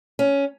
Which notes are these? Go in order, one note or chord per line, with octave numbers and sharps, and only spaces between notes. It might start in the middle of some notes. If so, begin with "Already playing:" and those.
C#4